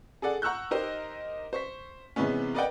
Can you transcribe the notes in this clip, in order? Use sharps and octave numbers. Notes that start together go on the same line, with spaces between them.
G#4 A4 D5 F#5
F#5 A#5 C#6 E6 F#6 G6
D#4 G4 A#4 C5 D#5
C5 C#6 B6
C3 E3 G#3 B3 C#4
A#4 B4 D5 D#5 F#5 G5